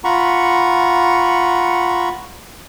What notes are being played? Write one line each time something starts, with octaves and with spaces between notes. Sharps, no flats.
F4 F#5 A#5 B5 C#6